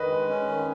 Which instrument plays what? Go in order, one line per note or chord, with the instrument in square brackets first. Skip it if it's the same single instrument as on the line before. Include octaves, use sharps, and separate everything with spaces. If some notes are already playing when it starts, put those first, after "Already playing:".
Already playing: [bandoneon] D#3 [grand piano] B4 D#5
[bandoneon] G#3
C#4
D#3